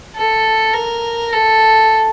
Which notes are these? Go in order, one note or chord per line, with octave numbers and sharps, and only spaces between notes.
A4
A#4
A4